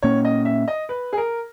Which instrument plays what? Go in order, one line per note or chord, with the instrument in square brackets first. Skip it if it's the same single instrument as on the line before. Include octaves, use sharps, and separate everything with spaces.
[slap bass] A#2 A#3 C#4 [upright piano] C#5
[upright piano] D#5
E5
D#5
B4
G#4
A#4